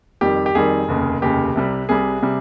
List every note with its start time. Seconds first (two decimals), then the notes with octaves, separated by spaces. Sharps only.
0.21 F2 D#3 G3 G4
0.46 G4
0.55 F2 D#3 G3 G#4
0.88 F1 D#2 C#3
1.22 F1 D#2 C#3 G4
1.55 C2 C3 G3
1.89 C2 C3 G3 G#4
2.22 C3 G3